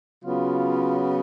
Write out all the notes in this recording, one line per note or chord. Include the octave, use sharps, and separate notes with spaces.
C#3 F#3 B3 F4